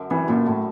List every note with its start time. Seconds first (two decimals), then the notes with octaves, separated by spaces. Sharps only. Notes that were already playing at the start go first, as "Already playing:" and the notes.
Already playing: F#2 D3
0.10 E3 G3
0.28 F#2 A#2
0.46 A2 D3